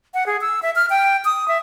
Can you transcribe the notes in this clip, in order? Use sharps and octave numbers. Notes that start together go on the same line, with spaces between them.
F#5
G#4
E6
E5
F6
G5
D#6
E5